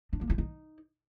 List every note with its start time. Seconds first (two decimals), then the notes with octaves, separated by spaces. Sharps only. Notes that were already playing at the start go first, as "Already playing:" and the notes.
0.13 D4
0.21 A#3
0.30 F4
0.38 D#4